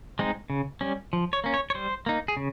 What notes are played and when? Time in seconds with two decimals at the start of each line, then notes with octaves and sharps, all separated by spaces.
0.19 G#3 C4 D#4
0.50 C#3
0.81 G3 C#4
1.13 F3
1.33 C#5
1.44 A#3 C#4
1.54 C#5
1.70 C#5
1.75 G3 C5
2.06 A#3 D#4
2.28 G#4
2.37 C#3